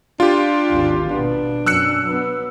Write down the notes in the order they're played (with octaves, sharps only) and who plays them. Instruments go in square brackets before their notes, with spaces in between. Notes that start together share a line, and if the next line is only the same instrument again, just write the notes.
[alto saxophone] D4 [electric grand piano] F4 G4
[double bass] G#1 D#2
[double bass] B2 B3 [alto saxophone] D4
[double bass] F#2 [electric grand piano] E6 F#6 C#7
[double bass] F#3 B3